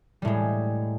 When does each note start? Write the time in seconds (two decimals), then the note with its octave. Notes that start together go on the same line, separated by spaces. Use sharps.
0.22 G3
0.25 A2
0.27 G#3